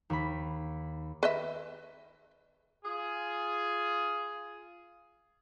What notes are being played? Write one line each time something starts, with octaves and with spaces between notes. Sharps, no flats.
D#2 B5
B4 D#5 E5
F4 G#4